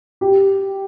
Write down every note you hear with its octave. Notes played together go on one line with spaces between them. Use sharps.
G4